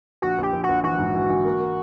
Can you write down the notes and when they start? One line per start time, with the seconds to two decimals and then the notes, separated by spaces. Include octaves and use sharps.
0.22 A#1 F#4
0.38 A#1 G4
0.53 A#1
0.64 F#4
0.69 A#1
0.84 E3 F#4
0.98 G#2
1.14 E3
1.29 E3
1.45 A#3
1.60 A#3